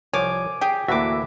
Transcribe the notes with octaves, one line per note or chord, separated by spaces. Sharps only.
C2 F3 C#5 G#5 D6
G4 G#4 G5
D2 A2 E3 A#3 F#4 E5 D6